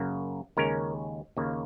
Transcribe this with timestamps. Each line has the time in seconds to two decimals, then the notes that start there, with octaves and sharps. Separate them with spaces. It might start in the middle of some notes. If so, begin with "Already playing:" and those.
Already playing: F#2 C#3 A#3
0.57 D#2 C#3 G#3 C#4 A#4
1.37 D#2 C#3 A#3